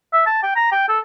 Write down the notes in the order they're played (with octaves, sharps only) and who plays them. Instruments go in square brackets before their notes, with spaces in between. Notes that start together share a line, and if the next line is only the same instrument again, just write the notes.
[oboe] E5
A5
G5
A#5
G5
A4